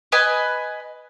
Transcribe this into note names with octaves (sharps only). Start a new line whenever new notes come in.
B4 D#5 G#5 B5